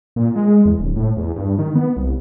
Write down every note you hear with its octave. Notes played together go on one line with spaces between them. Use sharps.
A#2
G#3
E2
D1
A2
E2
G2
D#3
B3
C2